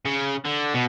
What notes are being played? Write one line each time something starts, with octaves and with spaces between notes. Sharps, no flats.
C#3
D3
B2